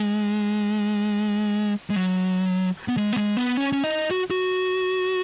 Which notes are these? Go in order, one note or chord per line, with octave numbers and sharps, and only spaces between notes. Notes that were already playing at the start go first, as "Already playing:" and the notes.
Already playing: G#3
G#3
F#3
B3
G#3
B3
G#3
B3
C#4
C#4
D#4
F#4
F#4